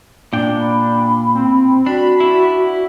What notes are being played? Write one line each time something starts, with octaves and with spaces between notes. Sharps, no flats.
A#2 D4 G5
B5
C4
D4 F#4 B5
D4 E4